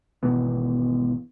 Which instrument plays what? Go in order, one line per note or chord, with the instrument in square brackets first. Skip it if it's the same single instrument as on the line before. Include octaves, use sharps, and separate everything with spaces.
[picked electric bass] G#1 B2 E3 B3